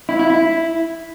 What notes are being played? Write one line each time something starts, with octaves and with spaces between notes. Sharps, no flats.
E4
E4
E4